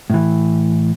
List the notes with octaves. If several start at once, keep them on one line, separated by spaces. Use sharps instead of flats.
A2 E3